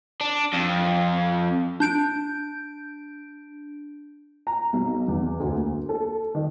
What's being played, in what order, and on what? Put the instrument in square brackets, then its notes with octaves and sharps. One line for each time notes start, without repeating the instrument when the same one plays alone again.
[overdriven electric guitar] D4
F2
[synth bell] D4 G6 D7
[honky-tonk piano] A#5
B1
E2
D2
A#3
A4
D#3